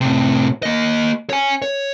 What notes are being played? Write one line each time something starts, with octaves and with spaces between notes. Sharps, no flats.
A2 C3
A#3 D#5
C#5 G#5
C#5